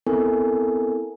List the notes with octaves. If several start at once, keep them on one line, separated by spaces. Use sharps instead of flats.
B3 C4 E4 A4 A#4 G#5